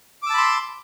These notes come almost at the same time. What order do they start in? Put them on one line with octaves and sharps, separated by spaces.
D6 E6 A5 B5 C6